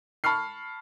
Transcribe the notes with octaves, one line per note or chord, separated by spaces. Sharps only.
A5 B5 C#6 F6 C7